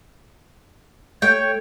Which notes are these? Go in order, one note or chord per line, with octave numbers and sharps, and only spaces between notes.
A3 C#5 G5